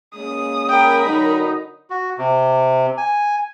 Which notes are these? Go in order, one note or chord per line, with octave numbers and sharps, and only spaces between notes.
G#3 A#3 C#4 D#6
A#4 G5 B5
D3 F#3 D#4
F#4
C3
G#5